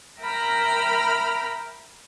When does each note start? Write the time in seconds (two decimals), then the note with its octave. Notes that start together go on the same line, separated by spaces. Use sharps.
0.20 A#4 E5 G5 A#5 B5 F6